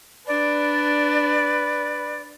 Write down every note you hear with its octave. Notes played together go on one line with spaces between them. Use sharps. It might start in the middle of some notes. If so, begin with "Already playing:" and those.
D4 B4 D5